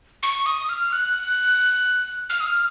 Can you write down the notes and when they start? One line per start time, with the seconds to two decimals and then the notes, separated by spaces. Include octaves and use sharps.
0.23 C#6
0.46 D#6
0.69 F6
0.92 F#6
2.30 F6
2.40 D#6
2.47 F6